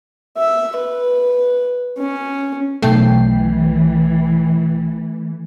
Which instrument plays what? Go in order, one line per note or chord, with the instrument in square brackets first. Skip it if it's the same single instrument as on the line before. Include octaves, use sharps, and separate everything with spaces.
[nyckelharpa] E5
B4
C#4
[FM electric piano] B1 G5 C7 [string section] E3 [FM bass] A3